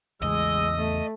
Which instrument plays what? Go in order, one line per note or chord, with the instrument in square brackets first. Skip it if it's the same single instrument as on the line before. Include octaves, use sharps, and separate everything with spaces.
[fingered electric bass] E2 C#3 E3 [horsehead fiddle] G#3 [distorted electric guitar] D#5 [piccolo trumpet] E6
[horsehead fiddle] A3